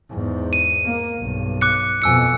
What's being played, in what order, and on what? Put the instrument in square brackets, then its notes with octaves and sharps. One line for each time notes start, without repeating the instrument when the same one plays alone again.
[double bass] E2 G#2
[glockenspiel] D#7
[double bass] A#3
B1 G2
[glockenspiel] D6 F#6 C#7
[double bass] F2 B2 [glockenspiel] G#5 E6 C#7